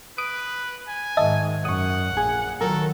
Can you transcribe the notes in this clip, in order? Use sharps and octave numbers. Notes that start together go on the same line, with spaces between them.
B4 D#6 D7
G#5
G#2 D#3 D#5 E5 A5
F#2 F#5 C#6 D#6
A#1 G#4
D#3 F#3 A4 A#4